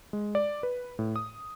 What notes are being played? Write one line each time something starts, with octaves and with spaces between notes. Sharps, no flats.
G#3
D5
B4
A2
D#6